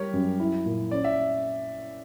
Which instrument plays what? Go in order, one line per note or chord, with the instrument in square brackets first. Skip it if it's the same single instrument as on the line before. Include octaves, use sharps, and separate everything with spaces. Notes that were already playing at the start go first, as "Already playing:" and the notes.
Already playing: [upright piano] G3 [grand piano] G4 A#4 C#5
[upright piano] F#2
E4
A#2
[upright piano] C#4 [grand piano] D5
[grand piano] E5